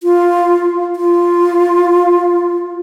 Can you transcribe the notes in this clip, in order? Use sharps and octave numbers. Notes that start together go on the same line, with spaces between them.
F4
F4